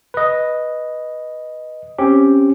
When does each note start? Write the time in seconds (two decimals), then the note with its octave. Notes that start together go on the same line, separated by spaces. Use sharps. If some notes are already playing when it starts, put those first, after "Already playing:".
0.14 B4 D#5
1.98 C4 C#4 G4